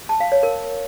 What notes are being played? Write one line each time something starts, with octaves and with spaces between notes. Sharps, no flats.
A5
F5
C#5
A#4